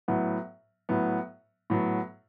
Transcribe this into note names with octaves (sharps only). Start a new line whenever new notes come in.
A2 F#3 B3
A2 F#3 B3
A2 F#3 B3